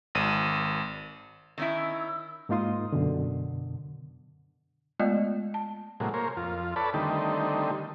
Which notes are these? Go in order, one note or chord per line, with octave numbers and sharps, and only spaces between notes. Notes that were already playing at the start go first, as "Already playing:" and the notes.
G#1 D#7
D#3 C#4 E4 E6
G#2 A#3 D#4 F4 C6 D#6
F#2 B2 D3
G#3 A3 B3 F4 D5 D#5
A5
A2 C3 F#3 G#3 A#3
A#3 A#4 C5 C#5
F2 F4
A4 B4 C#5 D5 A5 B5
D3 D#3 G3 A3 C4 D#4